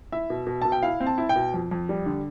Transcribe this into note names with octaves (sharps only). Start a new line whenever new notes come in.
E4 E5
B2
B2
B2 A5
G5
E4 F5
C4
A5
E4
G5
B2
F2
F2
G3
D3